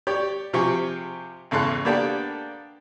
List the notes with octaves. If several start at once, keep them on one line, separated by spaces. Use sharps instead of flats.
G4 C#5 D5
C3 F3 G4 G#4 C#6
G#1 E2 C#3 A4 C6 F#6
A#3 B3 D4 G4 A4 G5